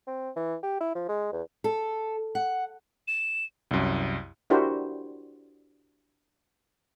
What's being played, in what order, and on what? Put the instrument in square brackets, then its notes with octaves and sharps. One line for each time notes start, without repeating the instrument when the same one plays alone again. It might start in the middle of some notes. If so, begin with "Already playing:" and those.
[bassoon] C4
E3
G4
E4
F3
G#3
E2
[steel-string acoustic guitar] A4
F#5
[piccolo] E7
[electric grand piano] C2 F#2
[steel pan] D4 E4 F#4 G4 A#4 C5